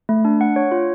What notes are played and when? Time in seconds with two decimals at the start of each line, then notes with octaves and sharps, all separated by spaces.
0.09 A3
0.25 D4
0.41 F#5
0.56 C#5
0.72 F4